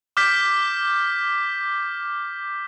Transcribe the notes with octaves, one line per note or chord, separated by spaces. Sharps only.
D6 F6 G6 B6